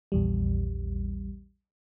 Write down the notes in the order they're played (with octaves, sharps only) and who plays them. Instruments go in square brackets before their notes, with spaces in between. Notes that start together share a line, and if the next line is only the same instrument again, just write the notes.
[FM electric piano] A#1 E2 G3